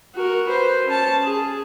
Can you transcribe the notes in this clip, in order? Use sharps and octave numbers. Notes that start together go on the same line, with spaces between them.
F#4 A#4
B4 C5
C#4 A5
G#4